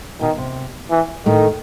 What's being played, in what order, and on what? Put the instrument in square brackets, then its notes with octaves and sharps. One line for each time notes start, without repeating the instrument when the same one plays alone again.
[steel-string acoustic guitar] B2 [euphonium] D#3
[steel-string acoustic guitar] C3
[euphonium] E3
[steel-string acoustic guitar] A2 A3 [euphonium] D#3